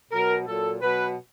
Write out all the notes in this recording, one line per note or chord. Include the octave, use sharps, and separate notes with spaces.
B2 F#3 A#4
A#2 F#3 A4
B2 F#3 B4